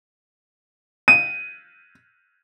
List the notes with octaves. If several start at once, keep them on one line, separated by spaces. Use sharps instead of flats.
D#7